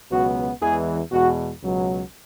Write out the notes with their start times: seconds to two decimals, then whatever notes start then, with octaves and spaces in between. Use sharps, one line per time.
0.10 C#2 B2 F#3 B3 F#4
0.60 E2 E3 G#3 G#4
1.11 E2 B2 G#3 F#4
1.62 C#2 B2 F#3